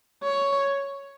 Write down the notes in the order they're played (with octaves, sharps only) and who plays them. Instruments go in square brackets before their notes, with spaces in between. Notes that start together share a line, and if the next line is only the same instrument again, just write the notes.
[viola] C#5